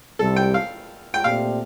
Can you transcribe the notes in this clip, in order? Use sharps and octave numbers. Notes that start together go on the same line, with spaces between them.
C2 C3 G3 A4
G5
F5
G5
A#2 A3 C4 G4 D5 F5